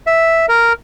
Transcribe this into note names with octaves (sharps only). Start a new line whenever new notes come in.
E5
A#4